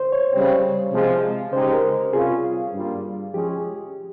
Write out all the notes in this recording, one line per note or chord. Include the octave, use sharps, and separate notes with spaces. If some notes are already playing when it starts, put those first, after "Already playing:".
Already playing: C5
C#5
C#3 G3 C4
C3 F3 G#3
C#3 G#3 D#4 G4 C5
A#4
C3 G3 C#4 F4 G#4
G2 G3 A#3 F4
F3 G#3 C#4 G4 G#4